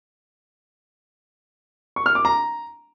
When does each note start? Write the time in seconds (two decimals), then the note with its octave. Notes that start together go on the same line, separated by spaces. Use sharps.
1.96 C#6
2.06 F6
2.15 D6
2.25 A#5